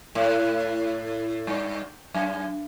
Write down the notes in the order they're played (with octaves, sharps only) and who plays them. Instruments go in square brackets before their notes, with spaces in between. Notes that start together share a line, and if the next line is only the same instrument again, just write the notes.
[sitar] A2
G2
F#2